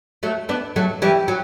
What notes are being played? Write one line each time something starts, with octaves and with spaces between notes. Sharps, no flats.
F#3 A3
B3 D4
F#3 A3
E3 G3
F#3